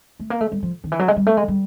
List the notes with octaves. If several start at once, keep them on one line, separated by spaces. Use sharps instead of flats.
A3
A#3
A3
G3
F3
D#3
E3
F#3
G#3
G3
A3
G#3
G3